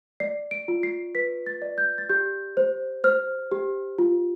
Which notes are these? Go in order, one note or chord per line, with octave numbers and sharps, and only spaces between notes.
D5 C7
D7
F4
C7
B4 B6
A6
D5
G6
A6
G4 G6
C5
C5 F6
G4
F4